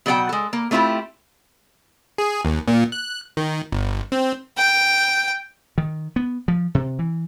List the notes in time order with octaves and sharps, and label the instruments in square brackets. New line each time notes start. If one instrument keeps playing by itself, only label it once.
[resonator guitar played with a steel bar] B2 F#3 A4 D5 F#5 G5
G#3 A4
A#3
A3 C4 E4 F4 G4
[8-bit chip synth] G#4
D#2
A#2
F#6
D#3
G1
C4
[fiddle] G5
[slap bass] D#3
B3
F3
C3
E3